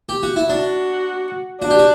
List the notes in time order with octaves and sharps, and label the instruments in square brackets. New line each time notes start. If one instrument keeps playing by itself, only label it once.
[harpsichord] G4
F#4
E4
[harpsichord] D4 [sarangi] F#4
[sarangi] D4 [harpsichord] F#4
[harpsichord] G4
F#4